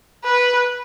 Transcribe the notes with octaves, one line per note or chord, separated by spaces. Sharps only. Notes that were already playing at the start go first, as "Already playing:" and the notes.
B4